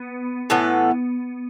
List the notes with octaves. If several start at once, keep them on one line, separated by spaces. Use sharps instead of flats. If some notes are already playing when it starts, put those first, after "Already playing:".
Already playing: B3
A2 E3 B3 A4